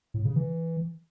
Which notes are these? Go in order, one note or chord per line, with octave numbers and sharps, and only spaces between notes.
A2
C#3
E3